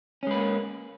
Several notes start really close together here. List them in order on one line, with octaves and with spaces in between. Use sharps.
C#4 G#3 B4 A#3